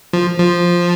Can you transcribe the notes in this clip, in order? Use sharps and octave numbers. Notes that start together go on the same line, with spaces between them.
F3
F3